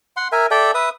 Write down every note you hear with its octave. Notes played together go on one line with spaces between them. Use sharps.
F#5 C6
A#4 E5 G#5
A4 D5 E5 G5
B4 E5 D#6